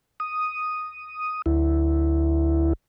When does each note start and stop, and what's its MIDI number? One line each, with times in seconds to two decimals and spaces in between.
0.20 1.42 87
1.46 2.73 38
1.46 2.73 64